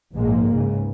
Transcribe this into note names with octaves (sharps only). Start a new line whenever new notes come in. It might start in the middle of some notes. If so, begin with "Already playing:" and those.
A#1 G#2 G#3 A#3
C#2 G#2 C#3